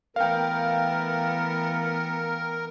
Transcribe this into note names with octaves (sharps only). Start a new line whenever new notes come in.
E3 A3 B3 A#4 F5 G5